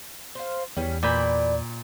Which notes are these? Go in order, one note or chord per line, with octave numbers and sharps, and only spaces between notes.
C5 F5
E2 G3 C#4
A#2 E3 D5 G5 B5